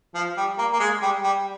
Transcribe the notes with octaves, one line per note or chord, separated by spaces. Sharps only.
F3
G3
A#3
A#3
G#3
G3
G3